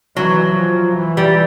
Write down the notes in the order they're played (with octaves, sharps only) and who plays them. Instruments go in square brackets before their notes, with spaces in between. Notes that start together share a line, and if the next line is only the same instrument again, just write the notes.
[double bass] E3 [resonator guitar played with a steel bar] F#3
[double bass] F3
E3
[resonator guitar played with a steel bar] G3